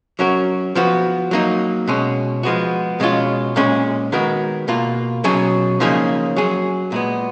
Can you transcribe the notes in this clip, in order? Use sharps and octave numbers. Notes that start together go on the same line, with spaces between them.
F#3 C#4 F#4 A#4
F3 B3 F#4
F#3 A#3 D#4
B2 G#3 C#4
F3 G#3 B3 F#4
B2 G#3 C#4 F4
A#2 G#3 C#4
D#3 G#3 B3 F#4 A#4
B2 A#3 F4
B2 F#3 C#4 G#4
C#3 F3 A#3 D#4 G#4
F#3 C#4 G#4
A#2 G#3 B3